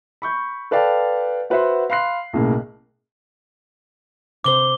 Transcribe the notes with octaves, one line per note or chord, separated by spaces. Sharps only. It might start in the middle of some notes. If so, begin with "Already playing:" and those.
B5 C#6 G6
A4 B4 D5 F5 G5 A5
F#4 B4 C5 E5 F#5 C6
F5 B5 C6 F#6 C7
B1 A2 C#3 A#3
C3 C5 D6 G7